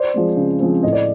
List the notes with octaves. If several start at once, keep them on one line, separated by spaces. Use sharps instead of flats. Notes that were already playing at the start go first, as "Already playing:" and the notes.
Already playing: C5 D5
F3 G#3 C4
C#3
F3 G#3 C4
A2 D#5
D5